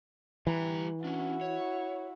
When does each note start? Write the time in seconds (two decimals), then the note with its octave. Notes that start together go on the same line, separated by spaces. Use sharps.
0.47 E3 G3 A#5
1.04 C#4 D4 E4 F#4
1.41 C#5